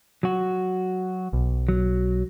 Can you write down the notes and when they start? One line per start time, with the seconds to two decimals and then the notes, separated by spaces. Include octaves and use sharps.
0.23 F#3 F#4
1.33 B1
1.69 F#3